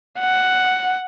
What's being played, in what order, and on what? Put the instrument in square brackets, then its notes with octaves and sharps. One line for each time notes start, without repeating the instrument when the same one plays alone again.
[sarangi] F#5